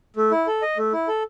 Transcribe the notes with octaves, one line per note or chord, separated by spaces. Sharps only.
A3
E4
A4
D#5
A3
E4
A4